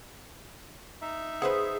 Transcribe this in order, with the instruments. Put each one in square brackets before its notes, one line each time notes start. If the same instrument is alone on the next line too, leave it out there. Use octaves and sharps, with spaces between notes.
[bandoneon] D#4 E5
[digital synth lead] G#4 [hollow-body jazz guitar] B4 C5 F#5